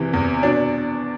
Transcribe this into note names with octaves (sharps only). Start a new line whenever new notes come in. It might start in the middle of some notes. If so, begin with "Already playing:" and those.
Already playing: E2 C3 E3
E2
B2 D4